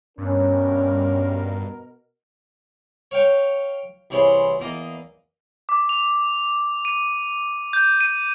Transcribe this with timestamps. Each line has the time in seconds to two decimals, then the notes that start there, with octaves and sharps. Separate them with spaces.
0.18 G2 B2 C#4 A#4
3.11 C#5 F5 G5 C#6
4.10 C2 E3 G#4 C#5 B5 C6
4.59 E2 A#3 D#5
5.69 D6
5.89 F7
6.85 D#7
7.73 G6
8.01 D#7